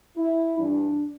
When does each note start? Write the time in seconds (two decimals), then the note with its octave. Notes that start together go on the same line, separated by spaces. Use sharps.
0.17 E4
0.58 G2 E3 D4